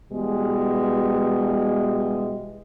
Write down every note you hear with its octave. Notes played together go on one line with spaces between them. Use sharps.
B2 E3 G3 G#3